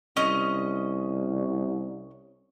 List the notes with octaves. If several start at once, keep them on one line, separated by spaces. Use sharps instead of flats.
C2 C#4 D#5